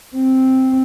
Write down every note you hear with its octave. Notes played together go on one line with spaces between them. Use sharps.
C4